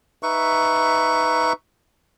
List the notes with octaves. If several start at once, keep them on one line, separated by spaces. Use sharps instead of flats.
D#4 B4 E5 C#6